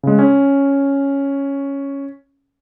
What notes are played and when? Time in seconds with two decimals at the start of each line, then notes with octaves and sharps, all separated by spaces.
0.03 C#3 G#3
0.19 C#4